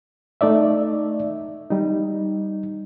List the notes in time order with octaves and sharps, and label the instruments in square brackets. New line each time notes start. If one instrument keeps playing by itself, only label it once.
[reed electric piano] A3 D#4 D5 E5
G3 D#4